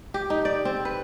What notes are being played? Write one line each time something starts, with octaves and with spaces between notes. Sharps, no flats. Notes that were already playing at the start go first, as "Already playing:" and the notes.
G4
D#4
D5
C4
B4